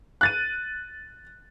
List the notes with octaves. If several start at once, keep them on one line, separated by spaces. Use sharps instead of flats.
F#6 A6 D#7